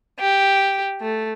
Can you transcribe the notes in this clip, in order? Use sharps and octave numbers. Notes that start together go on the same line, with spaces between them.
G4
A3